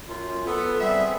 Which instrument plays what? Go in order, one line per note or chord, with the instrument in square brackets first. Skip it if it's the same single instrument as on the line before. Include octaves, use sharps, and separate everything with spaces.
[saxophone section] F#2 [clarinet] F4
[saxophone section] B3 [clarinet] A4
[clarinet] G3 [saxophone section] C4 G#4 E5